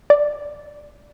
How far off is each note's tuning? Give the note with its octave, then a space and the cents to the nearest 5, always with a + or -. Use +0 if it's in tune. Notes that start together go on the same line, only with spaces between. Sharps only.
D5 +5